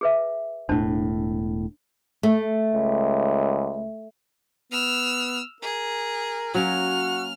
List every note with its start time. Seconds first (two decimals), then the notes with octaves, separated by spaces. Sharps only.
0.01 G#4 B4 E5
0.69 E1 A2 D4 C5 A5
2.23 A3
2.74 C#2
4.72 B3 E6 F6
5.62 G#4 A#4
6.55 F#3 A#3 C#4 F#4 F6